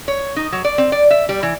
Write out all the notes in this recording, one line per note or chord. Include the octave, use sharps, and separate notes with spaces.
C#5
D#4
F#3
D5
C4
D5
E5
G3
E3